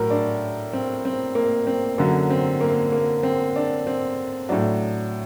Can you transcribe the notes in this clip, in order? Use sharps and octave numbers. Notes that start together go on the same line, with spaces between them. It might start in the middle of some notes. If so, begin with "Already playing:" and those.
Already playing: A2 F#3 A#4
D4
C4
C4
A#3
C4
F#2 D3 F#3 A#3
C4
A#3
A#3
C4
D4
C4
A2 F#3 D4